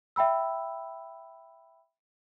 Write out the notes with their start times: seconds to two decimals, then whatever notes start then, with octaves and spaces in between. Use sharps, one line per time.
0.16 E5 G5 B5 E6